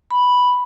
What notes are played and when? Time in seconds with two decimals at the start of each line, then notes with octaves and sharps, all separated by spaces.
0.11 B5